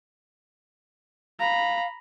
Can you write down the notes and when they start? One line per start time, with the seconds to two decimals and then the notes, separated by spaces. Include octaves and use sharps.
1.40 F5 A#5 B5